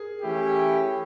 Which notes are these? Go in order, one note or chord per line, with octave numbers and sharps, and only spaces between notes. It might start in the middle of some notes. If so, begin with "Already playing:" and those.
Already playing: G#4 A#4
E3 A3 C#4 E4 G4